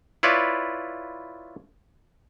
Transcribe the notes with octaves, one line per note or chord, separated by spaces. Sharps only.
E4 F4 B4 C#5 D5